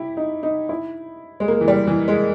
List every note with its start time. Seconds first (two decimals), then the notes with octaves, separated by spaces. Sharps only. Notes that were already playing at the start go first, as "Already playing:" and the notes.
Already playing: E4 G4
0.17 D#4
0.43 D#4
0.69 E4
1.40 G#3
1.48 A#3
1.61 E3
1.68 G3
1.87 E3
2.08 G#3